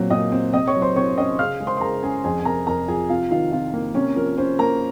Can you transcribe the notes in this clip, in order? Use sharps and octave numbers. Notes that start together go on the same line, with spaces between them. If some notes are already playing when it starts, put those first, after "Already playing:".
Already playing: A#2 F#3 C4
A#2 D#5 D#6
C4
C3 D#5 D#6
C#5 C#6
F#3
C5 C6
C3 C#5 C#6
C#4 D#5 D#6
C#3 F5 F6
G#3
C5 C6
C6
C#3 A#4 A#5
C#4 G#4 G#5
F2 G#4 G#5
G#5
C3 A#4 A#5
F2 A#4 A#5
F3 G#4 G#5
C3 F4 F5
D#3 F4 F5
C3 F4 F5
A#3
C3 C#4 C#5
F3 A#4
C#4 C5
A#3 A#4 A#5